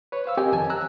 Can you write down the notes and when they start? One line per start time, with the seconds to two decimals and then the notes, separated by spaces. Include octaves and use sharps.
0.12 B4 C#5
0.26 C5 F5 E6
0.37 C4 G4 A#4 D#5 G5 G#5
0.52 F2 D#3 G#5 A5
0.70 A#5 E6 F#6